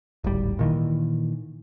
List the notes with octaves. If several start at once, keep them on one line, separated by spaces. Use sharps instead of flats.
D1 G#1 G3
A#2 D#3 E3